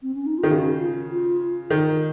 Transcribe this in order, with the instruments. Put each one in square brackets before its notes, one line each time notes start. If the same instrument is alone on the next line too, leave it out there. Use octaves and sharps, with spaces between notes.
[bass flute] C4
C#4
D#4
F4
[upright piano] D#3
[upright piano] C#3 [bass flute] F#4
[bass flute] F4
F4
[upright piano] D#3